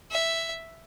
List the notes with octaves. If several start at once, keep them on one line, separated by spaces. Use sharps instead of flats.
E5